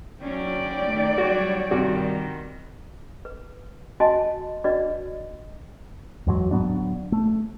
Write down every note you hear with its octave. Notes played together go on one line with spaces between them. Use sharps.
F#3 C#4 D5 G5
D#3 A3
F#3 G3 F#4 C#5
G2 C3 D#3 G3 F#4
B4
C#4 F#4 D#5 G#5 A5 C6
C#4 D4 F#4 B4 D5 D#5
E2 G#2 F#3
D1 F#3 B3 D4
A3